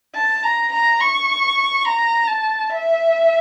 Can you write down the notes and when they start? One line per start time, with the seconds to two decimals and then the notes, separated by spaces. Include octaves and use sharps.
0.15 A5
0.43 A#5
0.72 A#5
1.00 C#6
1.85 A#5
2.27 A5
2.70 E5